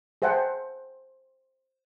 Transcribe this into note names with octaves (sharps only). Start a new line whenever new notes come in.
G#4 C5 E5 F#5 G5 A5